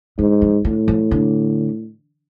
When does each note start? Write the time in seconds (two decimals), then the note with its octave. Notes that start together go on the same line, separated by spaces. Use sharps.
0.19 G#2 D3
0.42 F3
0.65 A2 D3
0.88 F3
1.11 D3